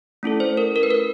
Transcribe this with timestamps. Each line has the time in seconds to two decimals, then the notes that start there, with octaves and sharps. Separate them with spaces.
0.23 A3 C#4 E4 A4
0.40 C5
0.57 A#4
0.76 A#4
0.83 B4
0.91 A#4